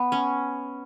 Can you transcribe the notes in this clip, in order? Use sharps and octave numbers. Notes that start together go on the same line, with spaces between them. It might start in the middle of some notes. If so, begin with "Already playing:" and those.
Already playing: B3
C#4